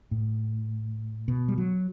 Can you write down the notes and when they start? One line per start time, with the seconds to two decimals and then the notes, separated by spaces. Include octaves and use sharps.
0.11 A2
1.28 B2
1.48 G3
1.58 F#3